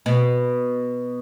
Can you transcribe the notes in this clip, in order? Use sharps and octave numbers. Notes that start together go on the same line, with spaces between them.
B2